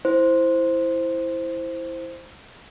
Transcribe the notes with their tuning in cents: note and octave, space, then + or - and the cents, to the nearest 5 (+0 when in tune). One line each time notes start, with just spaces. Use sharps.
E4 +0 C5 +0